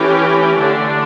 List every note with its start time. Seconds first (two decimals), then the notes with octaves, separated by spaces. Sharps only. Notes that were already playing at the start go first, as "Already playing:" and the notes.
Already playing: E3 A3 C#4 G4
0.60 D3 A3 D4